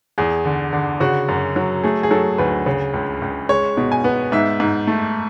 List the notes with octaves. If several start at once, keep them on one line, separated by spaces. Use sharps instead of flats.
E2 G#4
D3
D3
C#3 F#4
F#2
F#3
A3 G#4
G#4
F#3 A4
D2 B4
C#3
C#2
C#2
G#3 C#5
B2
G#5
B3
G#2 E5
G#2
A3